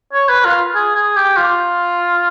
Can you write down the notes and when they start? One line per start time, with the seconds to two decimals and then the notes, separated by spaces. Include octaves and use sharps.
0.13 C#5
0.29 B4
0.45 F4
0.75 G#4
0.96 G#4
1.17 G4
1.37 F4